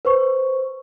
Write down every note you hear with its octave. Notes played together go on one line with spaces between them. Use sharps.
B4 C5 C#6